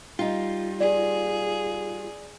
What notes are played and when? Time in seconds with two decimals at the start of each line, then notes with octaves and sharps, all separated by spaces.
0.19 G3 D#4 F4
0.80 G#4 D5